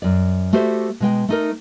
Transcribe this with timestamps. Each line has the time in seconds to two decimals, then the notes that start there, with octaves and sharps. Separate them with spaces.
0.02 F#2 D5
0.53 A3 F#4 G4 C5 D5 E5
1.00 B2 G#3 G5
1.28 A3 D#4 A#4